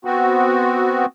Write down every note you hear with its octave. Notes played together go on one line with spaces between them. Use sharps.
B3 C4 F#4